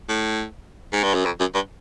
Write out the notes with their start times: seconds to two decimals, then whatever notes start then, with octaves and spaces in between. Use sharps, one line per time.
0.09 A2
0.93 G#2
1.03 G2
1.14 F#2
1.25 F2
1.40 F#2
1.54 G2